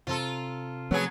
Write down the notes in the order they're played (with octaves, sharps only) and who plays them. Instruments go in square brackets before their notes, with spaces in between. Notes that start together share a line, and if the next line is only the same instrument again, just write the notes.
[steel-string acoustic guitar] C3 A#5 [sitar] F4 A4
[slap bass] F3 A3 C4 [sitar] F#3 B3 G#4